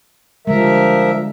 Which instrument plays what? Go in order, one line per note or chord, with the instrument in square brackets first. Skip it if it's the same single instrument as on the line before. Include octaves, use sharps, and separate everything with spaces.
[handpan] D3 G3 G#3 [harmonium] F3 A#4 E5